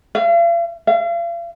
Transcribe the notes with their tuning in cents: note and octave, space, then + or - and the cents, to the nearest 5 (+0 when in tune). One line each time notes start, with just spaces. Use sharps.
F5 -45
F5 -40